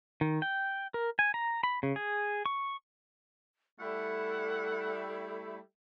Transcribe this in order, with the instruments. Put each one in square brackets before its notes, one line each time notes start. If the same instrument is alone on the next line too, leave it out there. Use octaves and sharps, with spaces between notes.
[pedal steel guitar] D#3
G5
A#4
G#5
A#5
B5
C#3
G#4
C#6
[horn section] G3 A3 E4 [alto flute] A4 [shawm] F#5